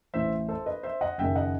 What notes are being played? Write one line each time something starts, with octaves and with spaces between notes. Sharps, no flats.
A1 A2 E3 C5 E5
A4 C5
B4 D#5
C5 E5
D#5 F#5
F#1 F#2 D#3 E5 G5
D#5 F#5